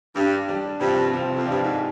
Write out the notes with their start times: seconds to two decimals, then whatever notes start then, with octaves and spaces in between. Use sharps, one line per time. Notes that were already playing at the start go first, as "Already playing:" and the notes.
0.15 G2 G3 D4 G4
0.48 G3 D4 G4
0.80 G2 C3 F3 C4 F4
1.12 C3 F3 C4 F4
1.35 F2
1.45 G2 F3 C4 G4 D5 F5
1.63 G#2